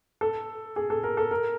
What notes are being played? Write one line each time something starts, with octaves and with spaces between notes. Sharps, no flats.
A4
G#4
A4
A#4
A4
A#4